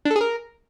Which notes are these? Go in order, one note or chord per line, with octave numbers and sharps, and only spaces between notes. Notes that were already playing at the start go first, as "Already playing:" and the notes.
D4
A4
G#4
A#4